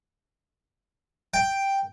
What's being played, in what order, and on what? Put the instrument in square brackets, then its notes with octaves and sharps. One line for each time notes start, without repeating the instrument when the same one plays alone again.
[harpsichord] G5